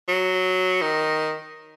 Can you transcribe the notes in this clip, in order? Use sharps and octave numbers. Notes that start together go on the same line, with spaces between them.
F#3
D#3